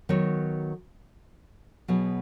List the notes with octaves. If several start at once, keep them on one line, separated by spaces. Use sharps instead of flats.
D#3 F#3 B3 F#4 C#5
B2 F#3 B3 G#4